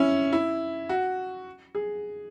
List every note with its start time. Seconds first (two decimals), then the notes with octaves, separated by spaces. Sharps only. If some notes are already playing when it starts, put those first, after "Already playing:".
Already playing: C#4 E4
0.33 E4
0.89 F#4
1.75 G#4